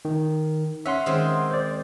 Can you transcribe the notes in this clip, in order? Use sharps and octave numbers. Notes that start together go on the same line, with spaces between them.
D#3
C#4 E5 F#5 C6
D#3 G#3 C4
C5 D5